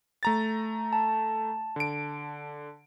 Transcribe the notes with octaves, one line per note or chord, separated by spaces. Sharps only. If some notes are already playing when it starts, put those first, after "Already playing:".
A3 A#5 A6
A5
D3 D7